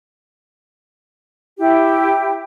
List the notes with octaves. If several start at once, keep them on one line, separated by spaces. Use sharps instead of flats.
E4 G4